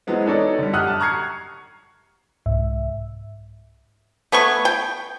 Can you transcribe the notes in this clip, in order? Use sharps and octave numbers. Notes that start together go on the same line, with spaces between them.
E3 F#3 G#3 B3 C4
D4 D#4 A4 C#5 D5
D3 G3
F#2 G4 F#5 D#6 F6 F#6
A5
A#5 C#6 F6 G#6 C7 C#7
C2 G#2 E5
A3 B3 G#5 C#6
G5